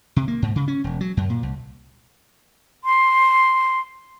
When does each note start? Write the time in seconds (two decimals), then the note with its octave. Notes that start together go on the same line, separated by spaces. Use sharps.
0.16 C3
0.28 A#3
0.42 G#2
0.56 C#3
0.68 C#4
0.84 E1
1.01 F#3
1.17 F#2
1.29 A#2
1.43 C2
2.84 C6